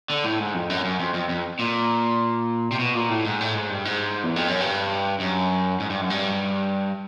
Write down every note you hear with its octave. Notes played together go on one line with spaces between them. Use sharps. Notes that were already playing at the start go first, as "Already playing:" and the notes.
D3
A2
G#2
F2
F#2
F#2
F2
F2
F2
A#2
C3
B2
A#2
A2
G#2
A2
G#2
G2
G#2
E2
F2
F#2
G2
F#2
G#2
G2
F#2
G2